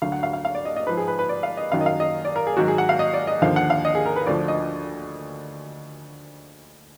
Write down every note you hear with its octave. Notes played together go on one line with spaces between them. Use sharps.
D2 D3 F#3 F5
F#5
F5
F5
F5
D5
D#5
D#5
G#2 F3 B4
G#4
B4
B4
D5
F5
D#5
F#2 D#3 F#3 F5
D#5
F5
D#5
D5
A#4
G#4
G#2 D#3 F#3 F#4
G#4
F#5
F5
D#5
D5
D#5
D#2 D3 F3 F5
F#5
F5
D#5
G#4
A#4
B4
D2 D3 F3 D5
D#5